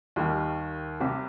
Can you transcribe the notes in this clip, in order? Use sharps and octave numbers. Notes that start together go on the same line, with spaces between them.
D#2 D#3 G3
C2 C3 G3